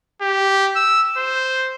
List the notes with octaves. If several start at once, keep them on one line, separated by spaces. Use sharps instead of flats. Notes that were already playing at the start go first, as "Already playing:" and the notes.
G4
E6
C5